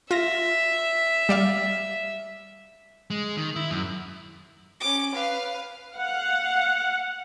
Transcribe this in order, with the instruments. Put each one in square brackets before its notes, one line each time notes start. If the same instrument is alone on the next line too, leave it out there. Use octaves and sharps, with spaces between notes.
[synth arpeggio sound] F4 A#6 [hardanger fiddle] E5
[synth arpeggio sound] G3 D5 F5
[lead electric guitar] G#3
D#3
E4
F#2
[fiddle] C#4 D6
B4 F5
[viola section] F5 F#5